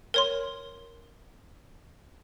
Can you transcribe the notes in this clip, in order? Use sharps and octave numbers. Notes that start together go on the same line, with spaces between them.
A#4 C#5 C6